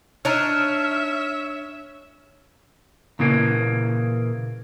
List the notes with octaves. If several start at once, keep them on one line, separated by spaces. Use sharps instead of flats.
D4 D#4 C#5 E5 F6
A#2 C#3 E3 A#3